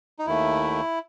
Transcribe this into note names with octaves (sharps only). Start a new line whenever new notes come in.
D#4
D#2 D#3 A3 E4